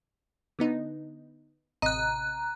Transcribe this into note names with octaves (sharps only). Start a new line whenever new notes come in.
D3 B3 D#4
A1 C3 D#5 A#5 F#6